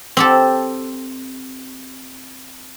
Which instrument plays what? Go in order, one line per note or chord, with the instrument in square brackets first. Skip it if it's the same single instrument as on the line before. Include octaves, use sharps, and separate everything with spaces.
[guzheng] C4 G4 A4